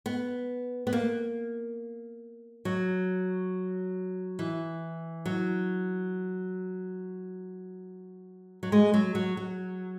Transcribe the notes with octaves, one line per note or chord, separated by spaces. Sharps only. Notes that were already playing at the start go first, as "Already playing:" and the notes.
B3
B3
A#3
F#3
E3
F#3
F#3
G#3
F#3
F#3
F#3